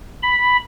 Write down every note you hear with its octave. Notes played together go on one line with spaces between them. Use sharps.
B5